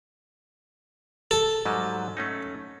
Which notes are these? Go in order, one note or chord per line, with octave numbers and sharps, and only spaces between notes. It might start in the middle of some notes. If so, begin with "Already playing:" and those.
A4
G#2 F#3 G3
A3 C#4 D#4